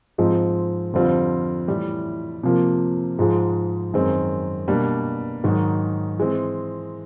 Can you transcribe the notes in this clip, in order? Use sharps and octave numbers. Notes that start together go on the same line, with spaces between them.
G#2 F3 G#3 C4 D#4
F2 D3 G3 C4 F4
A2 E3 G3
C3 F3 A#3
G#2 F3 G#3
F#2 D#3 G#3 C4
B2 G3 A#3 D4
G#2 D#3 F#3
E3 G#3 C4